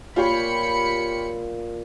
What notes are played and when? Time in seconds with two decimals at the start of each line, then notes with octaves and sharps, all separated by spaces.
0.16 A#2 F4 G4 C#5 F5 B5 C#7